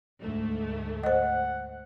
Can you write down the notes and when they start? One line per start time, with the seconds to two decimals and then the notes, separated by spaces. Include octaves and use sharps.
0.21 D2 G#2 A3
1.04 C5 D#5 F#5